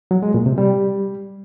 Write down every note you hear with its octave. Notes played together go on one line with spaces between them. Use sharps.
F#3
G#3
A#2
C3
G3